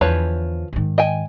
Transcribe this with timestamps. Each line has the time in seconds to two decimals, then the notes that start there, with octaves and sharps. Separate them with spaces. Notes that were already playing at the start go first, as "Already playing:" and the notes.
0.01 E2 D3 F3 B4 C#5
0.73 G#2 D#3
0.98 D#5 G5 G#5